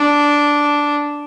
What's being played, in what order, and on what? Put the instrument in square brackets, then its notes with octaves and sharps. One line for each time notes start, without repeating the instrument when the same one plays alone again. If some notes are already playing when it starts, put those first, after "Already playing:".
Already playing: [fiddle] D4